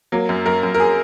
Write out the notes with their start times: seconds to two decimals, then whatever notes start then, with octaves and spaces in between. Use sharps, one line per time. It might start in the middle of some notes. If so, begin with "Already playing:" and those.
0.12 F#3 A#3
0.29 F#2
0.46 F#2 A#4
0.63 F#2
0.74 A#4
0.80 G#4